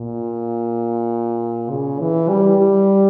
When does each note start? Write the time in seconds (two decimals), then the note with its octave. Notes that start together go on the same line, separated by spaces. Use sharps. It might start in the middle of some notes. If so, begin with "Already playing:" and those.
Already playing: A#2
1.70 C#3
2.00 E3
2.29 G3
2.58 G3